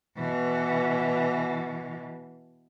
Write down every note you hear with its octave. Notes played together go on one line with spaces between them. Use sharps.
B2 E3